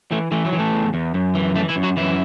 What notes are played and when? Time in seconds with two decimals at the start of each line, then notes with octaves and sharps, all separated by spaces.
0.11 E3 A3
0.32 E3 A3
0.45 F#3
0.53 E3
0.59 A3
0.73 E2
0.94 E2
1.14 F#2
1.35 E3
1.55 E3 A3
1.69 E3 E4
1.76 F#2
1.83 F#3 F#4
1.97 F#2 E3 E4